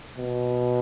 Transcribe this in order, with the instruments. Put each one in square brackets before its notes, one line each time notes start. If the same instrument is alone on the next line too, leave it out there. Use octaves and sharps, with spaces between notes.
[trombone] B2